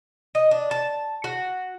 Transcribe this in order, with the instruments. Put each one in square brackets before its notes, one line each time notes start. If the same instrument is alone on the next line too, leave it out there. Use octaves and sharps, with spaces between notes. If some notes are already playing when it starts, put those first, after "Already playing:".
[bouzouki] D#5
D4
A5
F#4